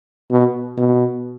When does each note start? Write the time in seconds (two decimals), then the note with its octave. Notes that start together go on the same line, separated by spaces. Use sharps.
0.31 B2
0.77 B2